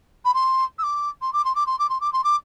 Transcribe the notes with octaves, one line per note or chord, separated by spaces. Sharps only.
B5
C6
E6
D6
C6
D6
C6
D6
C6
D6
C6
D6
C6
D6